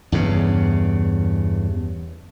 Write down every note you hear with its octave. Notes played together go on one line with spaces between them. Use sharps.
E2 G2 C#3